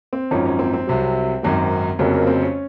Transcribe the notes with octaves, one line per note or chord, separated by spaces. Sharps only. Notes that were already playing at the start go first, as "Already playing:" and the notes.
C4
G#1 F#2 F3 C#4
C#4
C4
C4
C2 C3 F#3
G#1 F#2 D#3 F#3
F1 F2 C#3 F#3 A#3
A#3
C4
C#4